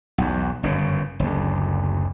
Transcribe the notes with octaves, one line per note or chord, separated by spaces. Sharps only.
B1 E2
G1 F#2 C#3
F#1 D2